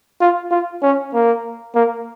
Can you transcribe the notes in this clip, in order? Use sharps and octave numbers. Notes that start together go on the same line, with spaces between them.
F4
F4
C#4
A#3
A#3